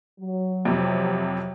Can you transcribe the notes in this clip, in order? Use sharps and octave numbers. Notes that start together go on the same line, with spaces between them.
F#3
F2 C3